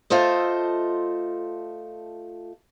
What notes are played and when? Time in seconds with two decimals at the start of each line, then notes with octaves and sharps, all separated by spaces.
0.10 A3 F4 A4 C5 D#5